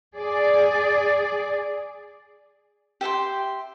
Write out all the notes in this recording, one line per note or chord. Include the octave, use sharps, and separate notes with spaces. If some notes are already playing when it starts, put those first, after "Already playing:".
G#4 D5
G4 E5 G5 C6